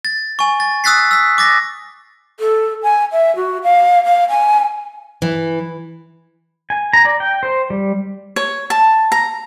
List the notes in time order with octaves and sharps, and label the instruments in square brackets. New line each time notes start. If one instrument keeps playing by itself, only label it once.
[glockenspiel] A6
G#5 C#6
A6
D#6 E6 F#6 A6 B6 C7
E6 B6
D6 A6 A#6
[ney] A4
G#5
E5
F#4
F5
F5
G#5
[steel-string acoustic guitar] E3
[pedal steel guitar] G#5
A#5
D5
G5
C5
G3
[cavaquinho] C#5
A5
A#5